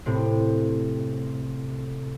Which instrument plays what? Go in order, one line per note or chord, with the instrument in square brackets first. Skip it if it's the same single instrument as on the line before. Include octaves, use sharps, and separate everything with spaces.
[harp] A2 C3 C4